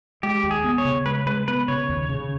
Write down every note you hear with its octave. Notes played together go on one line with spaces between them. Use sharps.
G#3 G4
D#2
G#4
B3
C#5
C#3
G#3 B4
G#3 B4
B3 B4
C#3 C#5
D#2
C#3